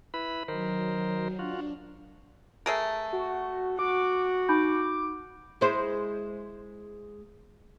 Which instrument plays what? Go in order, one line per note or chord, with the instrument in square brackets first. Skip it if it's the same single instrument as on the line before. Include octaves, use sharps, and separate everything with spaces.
[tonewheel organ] E4 B4 B5
[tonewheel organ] D#3 A#4 C5 [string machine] F#3
[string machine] D4 [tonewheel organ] F4 F#4
[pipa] A3 G#4 A#4
[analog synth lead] F#4
[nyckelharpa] F#4 [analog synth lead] D6
[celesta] D#4 B5 G6 [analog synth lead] D6
[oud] G#3 E4 C5